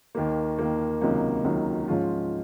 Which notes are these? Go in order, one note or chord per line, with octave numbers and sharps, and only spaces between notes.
D#2 D#3 A#3
D#2 D#3 A#3
C#2 C3 D#3 F#3 A#3
C#2 C3 D#3 F#3 A#3
G#2 F3 G#3 C#4 F4